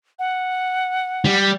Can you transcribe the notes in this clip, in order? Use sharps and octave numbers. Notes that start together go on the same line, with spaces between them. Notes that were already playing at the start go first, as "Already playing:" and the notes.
F#5
G3